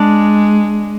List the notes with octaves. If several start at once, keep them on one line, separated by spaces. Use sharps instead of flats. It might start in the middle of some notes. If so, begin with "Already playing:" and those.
Already playing: G#3 D4